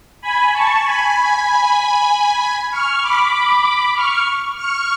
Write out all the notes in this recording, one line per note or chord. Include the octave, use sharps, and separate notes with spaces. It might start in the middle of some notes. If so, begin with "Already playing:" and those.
G#5 B5
A5 C#6
G#5 B5
C#6 F6
B5 D6
C#6 F6
C#6 F6